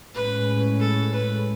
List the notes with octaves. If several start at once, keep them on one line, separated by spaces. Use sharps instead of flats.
A2 G#3 C#4 B4
A4
B4